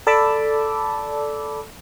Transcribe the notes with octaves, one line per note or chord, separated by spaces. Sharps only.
A4 D5 A5 B5 D6 E6